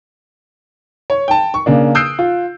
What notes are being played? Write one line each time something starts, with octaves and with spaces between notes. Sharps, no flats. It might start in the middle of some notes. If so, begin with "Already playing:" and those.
C#5
G5 A5
C#6
C#3 A#3 D4
D#6 E6 F#6 G6 C7 D7
F4